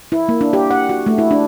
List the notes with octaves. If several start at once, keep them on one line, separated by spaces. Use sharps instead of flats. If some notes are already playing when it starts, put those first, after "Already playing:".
E4
A#3
D4
G4
F#5
F#4
A3
E4
D4